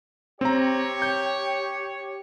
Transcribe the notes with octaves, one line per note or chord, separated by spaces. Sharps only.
C4 G4 C#5 A#5
G6